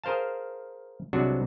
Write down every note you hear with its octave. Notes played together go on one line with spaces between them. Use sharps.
G#4 A#4 C5 F5 A5
C2 C3 F#3 G#3 D4 F#4